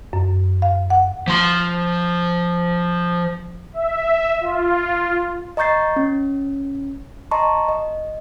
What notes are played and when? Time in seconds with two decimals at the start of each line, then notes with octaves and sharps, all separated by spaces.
0.13 F#2
0.62 F5
0.90 F#5
1.27 F3 C6
3.73 E5
4.41 F4
5.57 D#5 A#5 C#6 G6 A6 C7
5.96 C#4
7.31 D#5 A5 A#5 C6 C#6
7.69 D#5